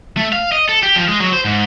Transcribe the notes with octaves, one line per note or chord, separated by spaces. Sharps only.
A3
F5
D#5
A4
G4
F3
G#3
F#3
C5
G#2